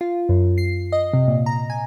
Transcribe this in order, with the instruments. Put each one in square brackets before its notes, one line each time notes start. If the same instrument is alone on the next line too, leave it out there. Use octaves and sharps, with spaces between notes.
[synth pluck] F4
F#2
C7
D#5
C3
A#2
A#5
G#5